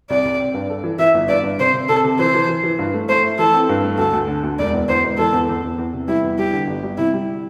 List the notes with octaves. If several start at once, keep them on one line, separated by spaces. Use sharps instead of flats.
C2 D5
C2
C4
G2
A4
E3
E3 E5
G1
G2 D5
G2
C3 C5
C3
C3 A4
C3
E3 C5
E3
E3
E3
G2
A3
A3 C5
E4
E3 A4
C4
G2
A3
D2 A4
D2
D3
D2
E1 D5
E2
E2 C5
E1
E3 A4
E2
E2
E2
E2
C3
G3 E4
E2
G3 G4
D3
G1
G3
C3 E4
G3